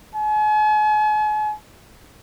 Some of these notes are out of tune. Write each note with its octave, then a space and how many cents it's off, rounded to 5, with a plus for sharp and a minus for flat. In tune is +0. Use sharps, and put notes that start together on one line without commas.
G#5 +45